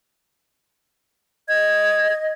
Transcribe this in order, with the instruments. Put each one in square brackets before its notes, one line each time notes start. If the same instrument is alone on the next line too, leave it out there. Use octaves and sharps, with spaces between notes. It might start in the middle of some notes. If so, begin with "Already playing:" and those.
[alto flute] D#5 [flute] G#6